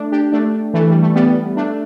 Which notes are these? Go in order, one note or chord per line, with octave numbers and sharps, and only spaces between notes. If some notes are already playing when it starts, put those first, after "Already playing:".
Already playing: A3 D4
D4 G4
A3 D4
E3 A3
G3
A3
G3 B3
A3 D4